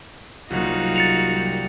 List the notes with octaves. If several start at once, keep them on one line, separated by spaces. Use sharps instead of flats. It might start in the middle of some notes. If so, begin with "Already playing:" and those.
C2 F#3 A#3 D#4 F4 F#4
A6 C#7 F7
G3